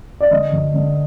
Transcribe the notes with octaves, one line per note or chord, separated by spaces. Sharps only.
D5
D3 D#5
D2
D3